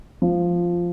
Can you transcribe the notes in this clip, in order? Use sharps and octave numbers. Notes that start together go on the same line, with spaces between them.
F3